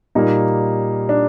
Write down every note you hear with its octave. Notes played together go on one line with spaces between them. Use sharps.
A#2 G3 A#3 D#4
D4